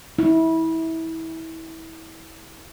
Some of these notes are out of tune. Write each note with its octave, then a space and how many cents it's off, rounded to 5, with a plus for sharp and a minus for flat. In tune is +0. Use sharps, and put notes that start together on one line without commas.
E4 -25